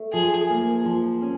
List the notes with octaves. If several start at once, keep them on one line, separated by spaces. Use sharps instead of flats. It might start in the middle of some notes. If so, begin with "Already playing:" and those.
Already playing: A3
F3 G#4
A#3
F3
C#4